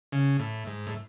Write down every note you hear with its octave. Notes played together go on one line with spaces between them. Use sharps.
C#3
A2
G#2
A2